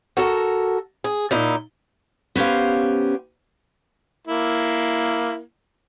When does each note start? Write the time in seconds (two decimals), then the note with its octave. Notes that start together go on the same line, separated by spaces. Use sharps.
0.17 F#4 A4 A#4
1.04 G#4
1.31 A#2 D#4 E4
2.36 B3 C#4 G4 C5 F5
4.27 A#3 E4